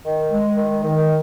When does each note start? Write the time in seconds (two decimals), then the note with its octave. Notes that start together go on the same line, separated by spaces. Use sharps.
0.04 D#3
0.30 G#3
0.56 D#3
0.82 D#3